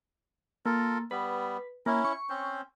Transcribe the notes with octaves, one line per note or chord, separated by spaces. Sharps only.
A#3 F4 A4 A#4
G3 B3 B4
A#3 C#4 E4
C#6
C4 C#4 C5